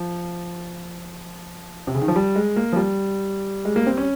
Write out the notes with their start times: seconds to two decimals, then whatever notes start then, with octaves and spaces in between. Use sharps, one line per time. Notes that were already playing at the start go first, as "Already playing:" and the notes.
Already playing: F3
1.87 C3
1.95 C#3
2.02 D#3
2.08 F3
2.16 G3
2.35 G#3
2.56 A#3
2.73 F3
2.76 G3
3.65 G#3
3.76 A#3
3.87 C4
3.97 C#4